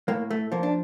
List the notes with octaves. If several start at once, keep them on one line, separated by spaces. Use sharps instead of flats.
A2 A#3
A3
F3 A#3
D4